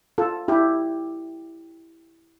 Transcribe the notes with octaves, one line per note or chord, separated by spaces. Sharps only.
F4 A4
E4 G4